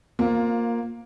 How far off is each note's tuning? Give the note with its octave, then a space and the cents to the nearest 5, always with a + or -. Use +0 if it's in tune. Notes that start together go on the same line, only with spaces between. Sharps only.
A#3 +0 F4 +20 C5 +0